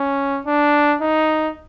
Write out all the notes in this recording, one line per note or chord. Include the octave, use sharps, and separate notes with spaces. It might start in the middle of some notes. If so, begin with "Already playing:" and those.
Already playing: C#4
D4
D#4